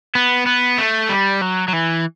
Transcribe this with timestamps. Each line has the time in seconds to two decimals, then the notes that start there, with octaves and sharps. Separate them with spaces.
0.15 B3
0.47 B3
0.78 A3
1.09 G3
1.42 F#3
1.68 F#3
1.73 E3